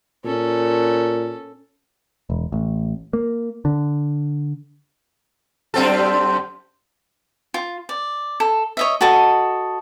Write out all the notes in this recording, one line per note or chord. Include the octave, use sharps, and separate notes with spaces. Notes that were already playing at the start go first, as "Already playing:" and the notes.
A#2 C#4 A4
E1
A1
A#3
D3
F#2 C4 A4
F4
D5
A4
C#5 D#5 E5
F#4 A4 D#5 A5